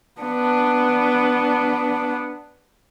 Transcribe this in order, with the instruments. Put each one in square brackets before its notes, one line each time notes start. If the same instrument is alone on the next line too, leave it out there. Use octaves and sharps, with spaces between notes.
[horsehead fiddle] B3 D4